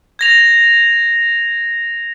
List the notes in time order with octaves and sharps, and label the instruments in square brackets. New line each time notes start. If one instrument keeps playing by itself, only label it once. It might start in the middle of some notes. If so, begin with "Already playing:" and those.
[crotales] G#6 A#6 F7